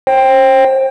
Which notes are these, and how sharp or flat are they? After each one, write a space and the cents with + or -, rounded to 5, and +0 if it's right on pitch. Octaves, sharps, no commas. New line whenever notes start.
C5 +30 G5 +5